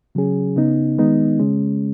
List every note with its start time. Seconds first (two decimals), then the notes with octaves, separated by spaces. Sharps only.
0.15 C#3 F#3 C#4 G#4
0.56 C#3 B3 D#4
0.99 D#3 G#3 B3 D#4
1.39 C#3 G#3 C#4